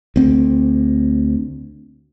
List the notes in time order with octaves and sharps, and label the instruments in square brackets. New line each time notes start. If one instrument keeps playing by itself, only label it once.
[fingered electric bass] D2 C4